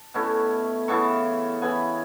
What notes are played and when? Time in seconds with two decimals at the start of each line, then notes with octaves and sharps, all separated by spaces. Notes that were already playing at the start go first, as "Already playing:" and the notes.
Already playing: A5
0.14 B2 A3 C#4 E4
0.88 C#3 E3 B3 E4 A5 C#6
1.62 C#3 E3 B3 E4 G#5 B5